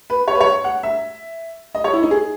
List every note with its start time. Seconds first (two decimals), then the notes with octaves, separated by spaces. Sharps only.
0.10 B4
0.28 C#5
0.35 B4
0.40 C#5
0.64 F#5
0.83 E5
1.75 D#5
1.84 C#5
1.93 E4
2.03 D#4
2.11 G#4